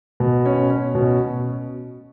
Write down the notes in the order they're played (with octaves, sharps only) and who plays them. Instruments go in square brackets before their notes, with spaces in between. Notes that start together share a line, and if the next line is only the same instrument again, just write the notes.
[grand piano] B2
C#4
C#4
B2